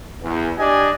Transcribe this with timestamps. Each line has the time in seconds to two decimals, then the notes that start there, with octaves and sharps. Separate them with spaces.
0.23 E2
0.58 D4 G4 D5 D#5 G#5